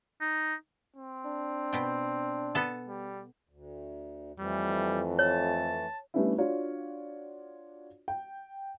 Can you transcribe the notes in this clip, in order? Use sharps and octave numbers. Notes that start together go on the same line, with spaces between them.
D#4
C4
D4
B2 G5
B3 A4
G3
D2
F2 E3 G3 A3
C#5 A5
G3 A3 B3 C#4 D4 E4
D4 F4 F#4 C#5 D5 F5
G5